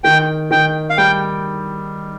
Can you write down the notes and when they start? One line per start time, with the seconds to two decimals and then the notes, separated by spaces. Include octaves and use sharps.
0.04 D#3 G5
0.51 D#3 G5
0.90 F5
0.98 G3 G5